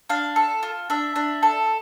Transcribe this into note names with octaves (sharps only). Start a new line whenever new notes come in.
D4 F5
A4
F4
D4 E5
D4
A4